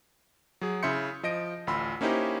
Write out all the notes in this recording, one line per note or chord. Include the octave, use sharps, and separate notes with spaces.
F#3 G#4
C#3 E4 E5 C6 G6 C#7
F3 D#5 A#6 D7
A1 D2 F4 B5 C6 E6
A#3 C#4 D#4 E4 G4 C5